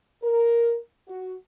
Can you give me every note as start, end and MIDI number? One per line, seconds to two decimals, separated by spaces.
0.23 0.77 70
1.08 1.35 66